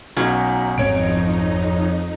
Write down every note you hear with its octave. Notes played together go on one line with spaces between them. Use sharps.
B1 F#3 C#4 D#4
G#1 F2 D3 C4 D#4 C#5 D7